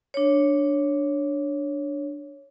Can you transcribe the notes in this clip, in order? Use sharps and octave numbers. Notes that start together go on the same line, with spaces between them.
D4 C#5